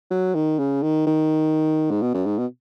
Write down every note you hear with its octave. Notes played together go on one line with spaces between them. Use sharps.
F#3
D#3
C#3
D#3
D#3
G#2
B2
F#2
G#2
B2